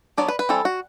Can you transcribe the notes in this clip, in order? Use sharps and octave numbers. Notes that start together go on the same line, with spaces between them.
F#3 B3 D4 D5
B4
B4
E3 G3 C4 A4
F#4